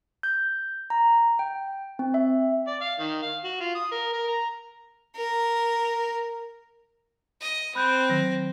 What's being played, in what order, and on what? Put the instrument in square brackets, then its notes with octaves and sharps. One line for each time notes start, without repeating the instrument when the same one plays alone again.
[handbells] G6
A#5
G5
C4
E5
[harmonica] D5
F5
D#3
F5
F#4
F4
D#6
A#4
A#4
A#5
[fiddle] A#4
[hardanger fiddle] D#5
[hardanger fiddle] C4 [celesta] B5 F#6 G6
[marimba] D#3 F#3 [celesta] A#6